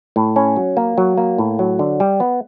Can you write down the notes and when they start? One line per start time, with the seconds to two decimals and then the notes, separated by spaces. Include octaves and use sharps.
0.16 A2
0.36 C#4
0.56 F#3
0.77 A#3
0.98 F#3
1.18 A#3
1.38 A2
1.59 F#3
1.79 D3
2.00 G3
2.20 B3